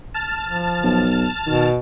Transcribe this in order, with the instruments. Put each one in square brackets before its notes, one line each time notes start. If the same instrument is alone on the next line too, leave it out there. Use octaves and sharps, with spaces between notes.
[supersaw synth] A5 F6 A6
[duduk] F3
[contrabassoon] B1
[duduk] B2 [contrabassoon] D#3